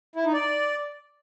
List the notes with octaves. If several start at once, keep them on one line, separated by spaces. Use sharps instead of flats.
E4
D#4
D5